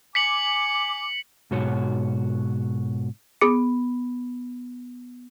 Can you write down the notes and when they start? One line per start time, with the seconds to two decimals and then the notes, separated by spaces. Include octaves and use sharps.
0.15 G#5 D6 B6 C#7 F#7
1.51 G#2 B2 F#4 C#5
3.41 B3 G#4 D6 C#7